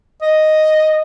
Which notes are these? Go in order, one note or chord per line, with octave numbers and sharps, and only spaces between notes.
D#5